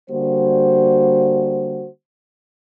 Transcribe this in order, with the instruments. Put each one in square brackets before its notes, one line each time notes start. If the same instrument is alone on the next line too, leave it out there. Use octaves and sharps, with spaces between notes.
[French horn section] D3 G3 A#3 F#4 C5